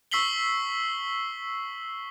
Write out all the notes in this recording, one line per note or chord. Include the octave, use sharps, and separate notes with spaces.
C#6 E6 B6 C7 F#7 G7